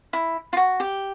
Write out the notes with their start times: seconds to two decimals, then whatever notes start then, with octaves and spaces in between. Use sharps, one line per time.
0.13 E4
0.53 F4
0.57 F#4
0.80 G4